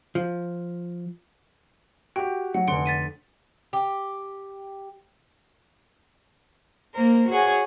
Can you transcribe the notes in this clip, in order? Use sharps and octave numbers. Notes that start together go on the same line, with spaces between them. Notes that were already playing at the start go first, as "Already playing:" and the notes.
F3
F#4 G4 G5
F#3 F#5
F1 D3 C6 C#7 D7
A6 B6 D#7
G4
A#3 A#4 C5
F#4 G#4 C#5 F#5 G#5